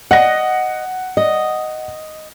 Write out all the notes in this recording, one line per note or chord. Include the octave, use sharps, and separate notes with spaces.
D#5 F#5 A#6
D#5